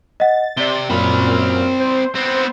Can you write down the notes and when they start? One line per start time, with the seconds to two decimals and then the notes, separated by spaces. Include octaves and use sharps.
0.20 D#5 F#5 A6
0.57 C3 D5 G7
0.89 F#2 A#2 C4 B5 F6
1.80 C5
2.15 B3 C4